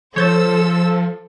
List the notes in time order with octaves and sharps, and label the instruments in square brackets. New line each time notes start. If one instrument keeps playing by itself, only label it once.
[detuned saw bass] F3 [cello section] A4 [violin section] C5 E6 [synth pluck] C#5 G6 A6